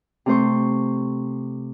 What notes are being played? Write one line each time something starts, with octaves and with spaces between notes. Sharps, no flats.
C3 A3 C5 C#6